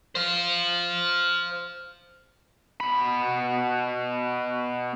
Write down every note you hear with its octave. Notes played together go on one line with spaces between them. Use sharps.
C5 F5
B2 B5